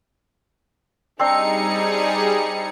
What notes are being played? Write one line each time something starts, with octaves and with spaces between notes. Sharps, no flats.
G3 C4 D4 D#4 G#4 C6 C#7